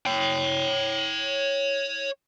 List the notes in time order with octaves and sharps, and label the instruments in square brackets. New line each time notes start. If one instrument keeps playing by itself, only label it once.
[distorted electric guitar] C#5 G5